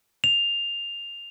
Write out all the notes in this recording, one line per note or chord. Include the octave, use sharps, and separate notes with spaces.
F7